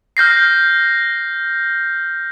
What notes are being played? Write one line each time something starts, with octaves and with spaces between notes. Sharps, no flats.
F6 G6 A#6 C7